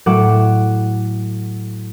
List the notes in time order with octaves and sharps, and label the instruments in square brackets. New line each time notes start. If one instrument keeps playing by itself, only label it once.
[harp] A2 F#3 F#5 D6 E7